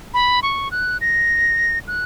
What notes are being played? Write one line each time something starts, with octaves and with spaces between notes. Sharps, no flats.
B5
C#6
F#6
A#6
F#6